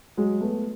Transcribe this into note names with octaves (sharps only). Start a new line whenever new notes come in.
F#3 G#3
A3 B3